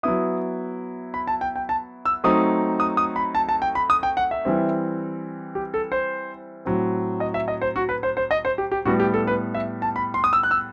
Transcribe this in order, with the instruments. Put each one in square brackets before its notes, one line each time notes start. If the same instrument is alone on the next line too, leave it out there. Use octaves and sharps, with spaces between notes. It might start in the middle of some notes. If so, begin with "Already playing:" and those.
[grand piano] F#3 B3 E4 D#6
B5
A5
G5
G5
A5
E6
F#3 A3 C4 D#4 D#6
D#6
D#6
B5
A5
A5
G5
B5
D#6
G5
F#5
E5
E3 G3 C4
G4
A4
C5
A2 F#3 C4
D#5
E5
D#5
C5
F#4
B4
C5
C5
D#5
C5
G4
G4
A2 G3 B3 F#4
G4
A4
B4
E5
A5
B5
C6
D#6
E6
F#6
E6